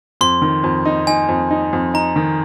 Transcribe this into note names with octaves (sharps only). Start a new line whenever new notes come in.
F2 C6
D#3
F2
D#4
D#4 G#5
F2
D#4
F2
D#4 A#5
D#3